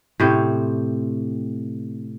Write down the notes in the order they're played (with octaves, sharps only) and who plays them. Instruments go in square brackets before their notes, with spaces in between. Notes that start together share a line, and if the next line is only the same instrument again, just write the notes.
[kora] A2 C3 C4 C#5